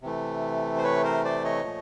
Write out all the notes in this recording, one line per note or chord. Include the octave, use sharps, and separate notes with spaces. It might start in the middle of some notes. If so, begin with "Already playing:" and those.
C3 E3 A3
C5
B4 C#5
A#4 C5
C5 D5
C#5 D#5
A#2 F3 A3